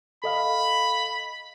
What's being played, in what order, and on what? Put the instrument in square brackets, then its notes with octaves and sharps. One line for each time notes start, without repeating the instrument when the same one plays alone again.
[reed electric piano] A4 D#5 F5 [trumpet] B5